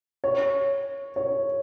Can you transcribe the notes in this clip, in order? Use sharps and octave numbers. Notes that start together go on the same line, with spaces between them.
C#5
C#5